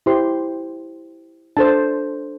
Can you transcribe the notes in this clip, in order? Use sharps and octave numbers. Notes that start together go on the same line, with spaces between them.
E4 G4 C5 C6
D4 A4 C5 A5